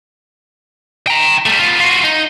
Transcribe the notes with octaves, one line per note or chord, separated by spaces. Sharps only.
G5 A#5
G3 A3
B3 F4
F4 F#4
D#4